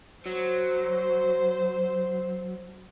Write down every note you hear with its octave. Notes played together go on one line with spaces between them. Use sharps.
F#3 C5